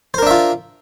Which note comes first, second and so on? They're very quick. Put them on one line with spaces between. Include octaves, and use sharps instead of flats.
C5 A#4 D4 E5 F4